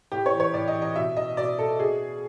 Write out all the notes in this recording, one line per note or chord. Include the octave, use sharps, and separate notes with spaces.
A2 G4
C#5
E3
C#5
A2 D5
D#5
E3
D#5
B2 E5
D#5
B2 D5
A4
B2 G#4